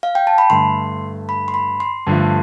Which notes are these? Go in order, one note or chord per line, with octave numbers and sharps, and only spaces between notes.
F5
G5
A5
B5
G2 D3 A3 C6
B5
C6
B5
C6
G2 D3 F3 A3